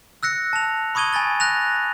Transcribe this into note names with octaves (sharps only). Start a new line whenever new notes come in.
E6 F#6 A#6 C#7
A5 F7
B5 C#6 D#6 G#6 D#7 G7
G#5 B5 A6 G7
F#6 A#6 F7